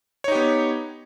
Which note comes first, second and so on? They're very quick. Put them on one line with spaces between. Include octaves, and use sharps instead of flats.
C#5 D#4 G4 B3